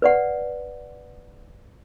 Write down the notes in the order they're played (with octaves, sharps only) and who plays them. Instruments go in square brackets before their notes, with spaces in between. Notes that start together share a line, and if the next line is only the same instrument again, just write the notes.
[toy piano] B4 D5 F#5